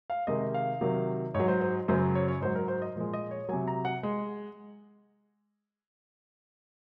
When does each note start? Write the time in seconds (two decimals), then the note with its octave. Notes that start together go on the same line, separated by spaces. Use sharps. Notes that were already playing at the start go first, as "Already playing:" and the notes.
0.10 F5
0.27 C3 D#3 G#3 D#5
0.54 F5
0.81 C3 D#3 F#3
1.34 G#2 C#5
1.40 F#3
1.48 C5
1.61 C5
1.88 F#2 C#3 F#3 C5
2.15 C#5
2.28 C#5
2.41 G#2 F#3 C5
2.55 A#4
2.68 C5
2.82 D#5
2.96 A#2 F3 G#3
3.13 D#5
3.31 C#5
3.49 C3 F#3 G#5
3.68 A#5
3.85 F#5
4.03 G#3